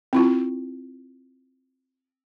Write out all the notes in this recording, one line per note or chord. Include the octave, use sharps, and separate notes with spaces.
C4 E4 F4